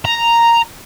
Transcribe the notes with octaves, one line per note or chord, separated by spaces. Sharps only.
A#5